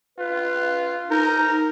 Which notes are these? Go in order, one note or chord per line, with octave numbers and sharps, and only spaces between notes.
F4 B4
D#4 A#4